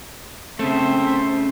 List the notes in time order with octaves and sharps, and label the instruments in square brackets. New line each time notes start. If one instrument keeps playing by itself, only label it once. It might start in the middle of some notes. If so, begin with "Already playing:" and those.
[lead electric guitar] C#3 A3 [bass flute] C4 [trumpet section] C5 E5 A5